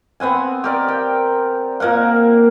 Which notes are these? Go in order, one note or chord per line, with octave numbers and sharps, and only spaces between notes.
B3 C4 F#5 G#5
G4 A#4 D5
G5
A#2 A#3 A#4 F#5